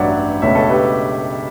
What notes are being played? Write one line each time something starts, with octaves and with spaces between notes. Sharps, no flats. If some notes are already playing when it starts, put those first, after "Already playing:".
Already playing: A1 G2 F#3 C#5 D5 E5 F#5
C#2 B2 A3 D4 C#5 E5
A4 C#5
G4 B4